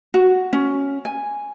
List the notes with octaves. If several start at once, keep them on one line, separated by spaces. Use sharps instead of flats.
F#4
C#4
G#5